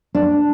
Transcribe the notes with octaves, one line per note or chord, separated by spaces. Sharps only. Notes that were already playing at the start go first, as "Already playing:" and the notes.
D4